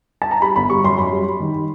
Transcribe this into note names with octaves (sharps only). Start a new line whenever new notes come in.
A5
A#5
G3 B5
G1 B5
G3 C#6
F#2 C6
F#2 B5
G3
G3
D#3